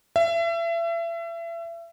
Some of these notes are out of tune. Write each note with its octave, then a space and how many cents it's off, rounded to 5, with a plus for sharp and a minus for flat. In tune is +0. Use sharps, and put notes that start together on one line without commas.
E5 +35